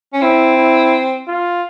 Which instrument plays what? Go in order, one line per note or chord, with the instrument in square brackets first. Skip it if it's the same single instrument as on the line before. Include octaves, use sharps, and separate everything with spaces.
[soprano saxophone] C#4
[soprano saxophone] C4 [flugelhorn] E4
[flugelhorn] E4
F4